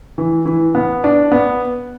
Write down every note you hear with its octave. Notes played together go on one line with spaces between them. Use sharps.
E3
E3
B3
D4
B3